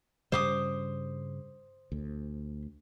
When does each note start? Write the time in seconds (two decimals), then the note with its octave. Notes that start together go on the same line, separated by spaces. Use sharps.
0.32 G2 C#3 G3 C5 D6 D#6
1.92 D2